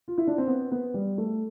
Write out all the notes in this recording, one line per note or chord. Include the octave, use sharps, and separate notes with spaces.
F4
E4
D4
C4
B3
B3
G3
A3